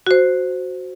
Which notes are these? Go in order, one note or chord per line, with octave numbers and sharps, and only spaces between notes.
F#4 C5